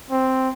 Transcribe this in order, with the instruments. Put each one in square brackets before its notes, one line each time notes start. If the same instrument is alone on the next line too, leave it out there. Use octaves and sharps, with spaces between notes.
[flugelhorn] C4